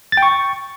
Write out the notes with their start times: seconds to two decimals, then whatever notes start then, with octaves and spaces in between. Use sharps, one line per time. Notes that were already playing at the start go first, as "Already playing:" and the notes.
0.12 A6
0.17 G5
0.22 C#6